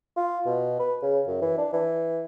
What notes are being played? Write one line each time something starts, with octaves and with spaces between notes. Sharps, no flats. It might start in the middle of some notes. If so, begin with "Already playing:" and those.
F4
B2
B4
C#3
F#2
E3
D4
E3